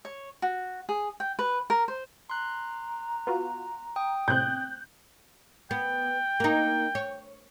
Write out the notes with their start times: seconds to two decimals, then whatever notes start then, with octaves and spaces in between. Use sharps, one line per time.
0.05 C#5
0.42 F#4
0.89 G#4
1.20 G5
1.39 B4
1.70 A#4
1.88 C5
2.30 A#5 C6 F#6
3.27 B3 F4 F#4
3.96 G5 D#6
4.28 A2 C3 C4 F#6 G6
5.71 B3 G5
6.40 A#3 D#4
6.95 C#5